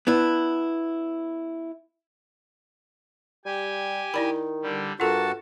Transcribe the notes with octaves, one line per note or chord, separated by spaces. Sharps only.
B3 D4 E4
G3 G4 G#5
D#3 E4 D5 B5
D3 G3
G2 F4 F#4 A4 A#4 F#5 A5